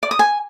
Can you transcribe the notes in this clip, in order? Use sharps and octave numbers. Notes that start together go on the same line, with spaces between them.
D5
D#6
G#5